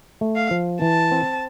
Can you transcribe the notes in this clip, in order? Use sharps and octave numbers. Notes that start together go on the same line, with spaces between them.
A3
F5
F3
E3 A5
C4